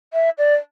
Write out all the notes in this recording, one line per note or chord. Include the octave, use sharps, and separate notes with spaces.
E5
D5